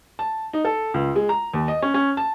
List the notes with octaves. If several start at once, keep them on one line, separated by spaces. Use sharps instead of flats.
A5
D#4
A4
C#2
G#3
A#5
D#2
D#5
C#4
C#4
A5